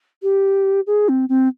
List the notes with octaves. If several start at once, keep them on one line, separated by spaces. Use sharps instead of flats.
G4
G#4
C4
C4